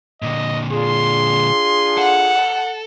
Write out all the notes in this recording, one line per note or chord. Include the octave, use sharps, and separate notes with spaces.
A#2 D3 D#5
D4 F4 G#4 C6
A4 F#5